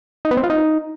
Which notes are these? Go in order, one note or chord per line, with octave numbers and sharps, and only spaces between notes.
D#4
B3
C4
F4
D#4